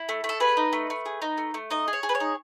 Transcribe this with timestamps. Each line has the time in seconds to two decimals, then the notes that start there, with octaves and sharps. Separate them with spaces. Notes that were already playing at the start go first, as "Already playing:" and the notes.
Already playing: E4
0.09 A3
0.24 A3
0.29 A4
0.40 G#4 B4
0.57 D#4
0.73 A3
0.90 A3
1.06 G#4
1.22 D#4
1.38 A3
1.54 A3
1.71 D#4 D#5
1.88 G#4
1.93 C#5
2.03 G#4
2.09 B4
2.15 C#5
2.20 D#4